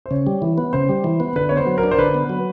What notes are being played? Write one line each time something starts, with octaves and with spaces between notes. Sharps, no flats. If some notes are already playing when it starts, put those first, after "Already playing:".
C5
C#3 C#5
G3
E3
B3
C#3 C5
G3
E3
B3
D3 B4
B3 C#5
C5
F#3
A#4
D4
C5
D3 B4
B3
F#3